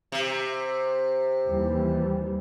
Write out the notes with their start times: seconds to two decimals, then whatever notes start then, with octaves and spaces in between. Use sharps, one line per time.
0.12 C3
1.48 D#2 E3 G3